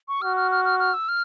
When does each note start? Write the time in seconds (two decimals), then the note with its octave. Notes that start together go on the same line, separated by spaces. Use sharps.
0.08 C#6
0.22 F#4 F6
0.37 F6
0.51 F6
0.65 F6
0.80 F6
0.94 E6
1.08 F6